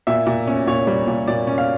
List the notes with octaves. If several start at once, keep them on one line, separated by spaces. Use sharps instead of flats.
A#2 E5
A#2
C#4
A#2 C#5
G3
A#2
A#2 D5
C#4
F5